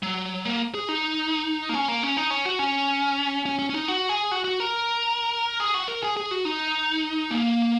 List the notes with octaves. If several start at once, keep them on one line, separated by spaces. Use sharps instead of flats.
F#3
A#3
G#4
D#4
A#3
C#4
A#3
C#4
D#4
C#4
F#4
C#4
C#4
C#4
C#4
D#4
F#4
G#4
F#4
F#4
A#4
G#4
F#4
A#4
G#4
G#4
F#4
D#4
A#3